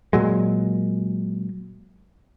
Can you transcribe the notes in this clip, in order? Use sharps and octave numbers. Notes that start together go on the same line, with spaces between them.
A#2 F#3 G#3